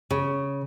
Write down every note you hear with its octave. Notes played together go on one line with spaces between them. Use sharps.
C#3